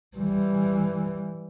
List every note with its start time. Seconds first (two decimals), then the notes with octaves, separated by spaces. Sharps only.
0.17 E3 G3